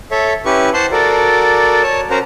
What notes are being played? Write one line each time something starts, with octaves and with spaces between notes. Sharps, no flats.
A4 C#5 E5
C#4 E4 G4 B4 C#6
C5 F#5 A5 C6
F#4 A4 A#4 D5
C#5 A5
C#4 F#4 A#4 C5 A#5